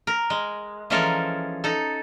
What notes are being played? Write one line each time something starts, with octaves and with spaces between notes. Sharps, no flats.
A#4
G#3
E3 F3 G#3 C#4 A4 A#4
D#4 A4